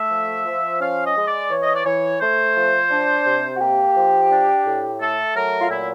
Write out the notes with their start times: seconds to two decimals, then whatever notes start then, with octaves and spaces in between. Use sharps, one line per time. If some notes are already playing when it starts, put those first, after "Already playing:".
Already playing: A3 E5
0.11 F3
0.45 F3
0.80 C#4 F5
1.05 D#5
1.16 G#3
1.28 D5
1.51 E3 C#5
1.63 D#5
1.74 D5
1.85 E3 C#5
2.20 A3 C5
2.56 F3
2.90 D4
3.25 C3
3.55 F#4
3.60 A#3 G4
3.95 F3
4.31 D4
4.65 A2
5.00 A3 A4
5.36 F#3 A#4
5.61 F4
5.70 A#2 E4